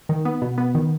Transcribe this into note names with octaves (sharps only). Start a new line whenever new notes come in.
D#3
B3
B2
B3
D#3